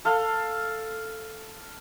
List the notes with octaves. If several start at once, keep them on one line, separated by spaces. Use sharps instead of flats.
A4 F5